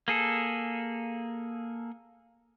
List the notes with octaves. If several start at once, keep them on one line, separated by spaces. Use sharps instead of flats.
A#3 G#4 A4